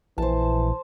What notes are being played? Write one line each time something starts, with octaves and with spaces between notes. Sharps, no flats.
A#1 E3 C5 A5